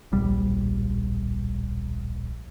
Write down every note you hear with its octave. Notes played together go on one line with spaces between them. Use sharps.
D1 A#1 G3